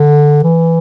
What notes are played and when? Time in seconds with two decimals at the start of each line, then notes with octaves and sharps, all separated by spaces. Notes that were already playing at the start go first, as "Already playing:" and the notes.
Already playing: D3
0.44 E3